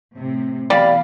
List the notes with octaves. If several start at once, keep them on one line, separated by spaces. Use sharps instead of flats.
A2 C3
B2 E3 G3 D5 F5 B5